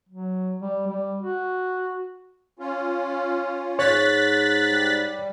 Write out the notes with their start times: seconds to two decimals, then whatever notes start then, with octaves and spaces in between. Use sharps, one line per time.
0.09 F#3
0.62 G3
0.87 G3
1.22 F#4
2.59 C#4 F4
3.79 G#2 C#5 F#6 A6 B6
4.70 G3